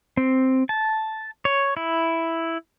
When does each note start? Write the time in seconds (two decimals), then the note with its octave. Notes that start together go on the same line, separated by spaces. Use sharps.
0.17 C4
0.69 A5
1.45 C#5
1.77 E4